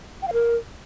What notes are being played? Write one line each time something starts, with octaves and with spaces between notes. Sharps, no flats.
G5
F5
A#4